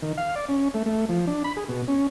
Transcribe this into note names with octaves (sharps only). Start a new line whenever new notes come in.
D#3
F5
D5
C#4
A3
A3
F3
D4
B5
G#4
B2
C#4